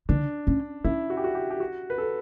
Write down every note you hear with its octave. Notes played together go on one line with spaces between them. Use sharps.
D3 D4
C#4
C#4 E4
F#4
G4
F#4
G4
G4
F#4
B4
A4